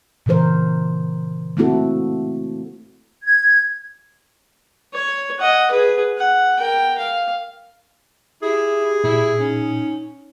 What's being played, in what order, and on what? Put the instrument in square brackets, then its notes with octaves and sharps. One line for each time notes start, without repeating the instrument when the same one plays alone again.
[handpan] A#2 C#3 E3 A#4 C5
A3 A#3 C4 E4 F#4 A4
[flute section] G#6
[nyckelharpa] C#5
D#5 F#5
G#4 B4
F#5
A#4 G5
F5
[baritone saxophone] E4 [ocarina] G4 [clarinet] G#4
[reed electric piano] A#2 [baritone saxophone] E4
[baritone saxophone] C#4 [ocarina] D#4